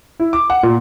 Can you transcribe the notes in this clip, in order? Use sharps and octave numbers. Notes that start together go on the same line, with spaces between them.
E4
D6
F#5
A#2